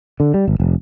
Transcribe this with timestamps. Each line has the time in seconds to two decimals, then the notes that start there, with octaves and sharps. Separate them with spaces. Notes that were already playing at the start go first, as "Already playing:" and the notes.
0.20 D3
0.34 G3
0.48 G#1
0.60 F1